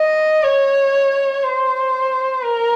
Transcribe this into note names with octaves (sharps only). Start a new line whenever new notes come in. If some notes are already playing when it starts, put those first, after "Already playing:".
Already playing: D#5
C#5
C5
A#4